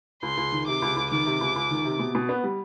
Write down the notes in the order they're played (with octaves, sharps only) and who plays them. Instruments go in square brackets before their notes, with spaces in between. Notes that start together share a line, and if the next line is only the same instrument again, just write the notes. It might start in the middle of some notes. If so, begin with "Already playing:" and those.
[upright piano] C#2 [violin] C6
[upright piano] C#2
D#3
[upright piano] C3 [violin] D6
[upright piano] C#2
C#2
[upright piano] D#3 [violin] D6
[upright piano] C3
C#2
C#2
D#3
C3
B2
B2
B3
G3